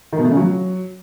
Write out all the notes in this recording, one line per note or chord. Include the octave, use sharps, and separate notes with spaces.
D#3
B2
A3
C#3
F#3